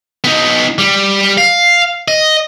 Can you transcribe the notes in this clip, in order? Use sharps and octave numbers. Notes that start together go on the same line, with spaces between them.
B3 D#4
G3
F5
D#5